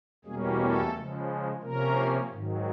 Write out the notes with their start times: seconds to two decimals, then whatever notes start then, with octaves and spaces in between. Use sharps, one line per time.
0.25 E2 B2 G3 G#3 A#3 C#4 G#4
0.59 A3 A4
0.94 C#3 F3 G#3
1.62 C3 F3 A#3 C#4 A#4
2.31 G#2 D#3 F#3